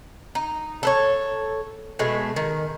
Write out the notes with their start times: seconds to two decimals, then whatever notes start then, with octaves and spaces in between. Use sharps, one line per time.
0.35 D#4
0.83 A4 B4 C#5
1.99 B2 G#3 A3
2.36 D#3